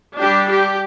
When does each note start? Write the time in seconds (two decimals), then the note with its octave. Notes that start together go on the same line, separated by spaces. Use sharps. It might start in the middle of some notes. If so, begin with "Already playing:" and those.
0.18 G3 D4 G4
0.49 G4